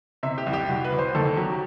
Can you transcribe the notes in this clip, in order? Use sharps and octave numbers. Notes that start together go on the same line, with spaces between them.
C3 E5
G4
C2
G4
C2 F#4
B4
C2
C5
D#2 A4
F#3 G4